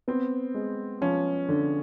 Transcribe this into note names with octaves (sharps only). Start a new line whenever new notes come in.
B3 C4
G#3
F3 C#4
D3